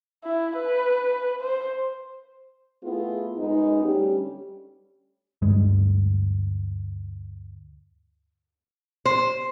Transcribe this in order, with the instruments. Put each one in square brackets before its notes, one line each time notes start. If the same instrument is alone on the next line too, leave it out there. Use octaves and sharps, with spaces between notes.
[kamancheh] E4
B4
C5
[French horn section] A3 B3 E4 F4 G#4
F#2 G#3 B3 D#4
D2 G3 C#4 G4
[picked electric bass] D2 G2 G3 G#3
[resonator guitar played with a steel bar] C5